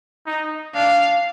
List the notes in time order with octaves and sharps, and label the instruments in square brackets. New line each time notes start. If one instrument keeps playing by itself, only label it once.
[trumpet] D#4
[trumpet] D4 [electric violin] F5